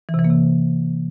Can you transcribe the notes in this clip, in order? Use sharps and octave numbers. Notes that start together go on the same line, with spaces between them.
E3
C3
E3
A#3
C3